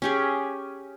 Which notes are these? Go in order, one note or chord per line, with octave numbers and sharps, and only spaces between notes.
C#4 G4 G#4